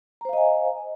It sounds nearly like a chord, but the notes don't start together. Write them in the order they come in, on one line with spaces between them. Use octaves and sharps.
A#5 C5 F5 D#5 G#5